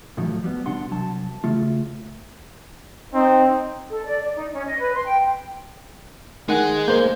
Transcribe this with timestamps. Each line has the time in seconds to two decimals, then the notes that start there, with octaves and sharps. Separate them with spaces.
0.17 A2 D#3 F3 F#3 A3
0.44 G3 B3
0.66 B2 D4 F#5 C6
0.90 C2 F#3 A5
1.44 C#3 A3 F4
3.14 C4 D#4
3.90 A4
4.05 D5
4.23 D5
4.36 D#4
4.53 C#4
4.65 D#5
4.79 B4
4.94 C6
5.06 G5
6.48 D#3 G#3 F#5
6.88 A#3 C5 G6